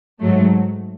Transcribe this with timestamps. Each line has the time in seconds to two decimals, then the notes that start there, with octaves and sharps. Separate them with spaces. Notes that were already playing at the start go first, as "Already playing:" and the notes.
0.20 G#2 F#3 A3